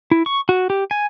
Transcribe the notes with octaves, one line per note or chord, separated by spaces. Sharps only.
E4
C#6
F#4
G4
G#5